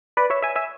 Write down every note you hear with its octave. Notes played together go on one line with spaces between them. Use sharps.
B4 D5
C#5 E5
E5 G#5
E5 G#5